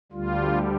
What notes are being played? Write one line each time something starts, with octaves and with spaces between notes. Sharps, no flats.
D2 D3 G3 F4